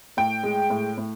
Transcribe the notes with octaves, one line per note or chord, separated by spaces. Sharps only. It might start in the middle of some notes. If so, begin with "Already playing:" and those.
A2 G5
G#3
A2
A2